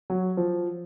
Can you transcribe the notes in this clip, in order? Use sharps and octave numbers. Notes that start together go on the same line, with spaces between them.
F#3
F3